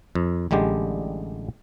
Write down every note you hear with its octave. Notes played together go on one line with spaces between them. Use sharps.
F2
A1 D3 G3 G#3 G4